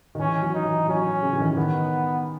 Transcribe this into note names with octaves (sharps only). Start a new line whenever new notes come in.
D#3
E3 C#4
F#3
D#4
E3
F#3 C#4
C#3
E3
D#3
D#3 B3